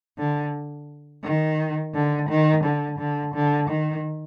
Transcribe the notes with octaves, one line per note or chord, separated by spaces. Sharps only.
D3
D#3
D3
D#3
D3
D3
D3
D#3